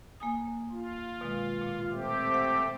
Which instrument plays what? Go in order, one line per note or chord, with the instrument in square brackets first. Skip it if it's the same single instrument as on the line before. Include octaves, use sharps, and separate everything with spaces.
[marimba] A#3 G#5 D#6
[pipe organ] F4
[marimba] B2 D#3 G#3
A#2
[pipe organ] A3 C4 G4
[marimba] C5 F#5